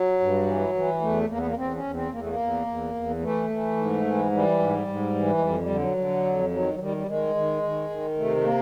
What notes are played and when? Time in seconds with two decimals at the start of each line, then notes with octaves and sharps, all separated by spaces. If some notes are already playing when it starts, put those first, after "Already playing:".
Already playing: F#3
0.20 G2
0.46 E3
0.74 E3
1.01 E2 A3
1.29 E2 A#3
1.38 B3
1.47 A#3
1.56 E2 C4
1.75 C#4
1.84 E2
1.94 C4
2.12 E2 A#3
2.21 A3
2.28 A#3
2.39 E2
2.67 E2
2.94 E2
3.21 E3 A3
3.50 E3
3.77 G#2
4.05 E3
4.32 E3 G3
4.59 G#2
4.87 G#2
5.15 E3
5.38 G#3
5.41 F2 G3
5.60 G3
5.69 D3
5.79 F#3
5.97 D3
6.25 F2
6.51 D#3 F#3
6.74 F#3
6.79 D#3 G3
6.97 G3
7.07 D#3 G#3
7.35 D#3
7.63 D#3
7.90 D#3
8.18 C3 A3
8.37 A3
8.44 A#3